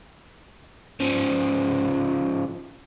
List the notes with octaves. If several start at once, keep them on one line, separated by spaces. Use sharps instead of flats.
C#3 F3